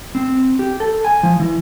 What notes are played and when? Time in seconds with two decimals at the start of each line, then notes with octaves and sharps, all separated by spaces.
0.15 C4
0.59 G4
0.80 A4
1.05 G#5
1.23 F3
1.40 E3